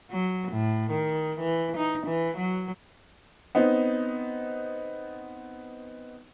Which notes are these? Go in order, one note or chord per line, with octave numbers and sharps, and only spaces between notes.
F#3
A2
D#3
E3
D#4
E3
F#3
B3 C4 D#4